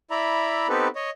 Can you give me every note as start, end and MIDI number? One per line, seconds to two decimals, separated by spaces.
0.11 0.68 64
0.11 0.68 74
0.11 0.68 76
0.11 0.68 82
0.11 0.68 83
0.69 0.88 59
0.69 0.88 60
0.69 0.88 63
0.69 0.88 67
0.69 0.88 69
0.69 0.88 71
0.95 1.10 73
0.95 1.10 75